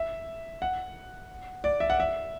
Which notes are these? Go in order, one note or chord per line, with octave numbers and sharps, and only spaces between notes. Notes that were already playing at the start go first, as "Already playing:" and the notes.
Already playing: E5
F#5
D5
E5
F#5
E5